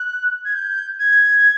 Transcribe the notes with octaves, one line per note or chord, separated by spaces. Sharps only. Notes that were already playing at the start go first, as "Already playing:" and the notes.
Already playing: F#6
G#6
G6
G#6